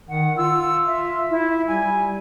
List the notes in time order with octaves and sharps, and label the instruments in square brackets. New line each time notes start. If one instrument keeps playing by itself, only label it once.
[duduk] D#3 [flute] F#5
[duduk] F4 [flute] E6
[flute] E5
E4
[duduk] G3 [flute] G#5